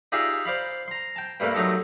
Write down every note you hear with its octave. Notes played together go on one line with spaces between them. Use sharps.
D#4 F4 G4 G#4 D5 E5
C5 D5 F5 B5
A#5 C6
G5 A5
G2 G3 A3 A#3 B4
F#3 A3 D#4 G4 A4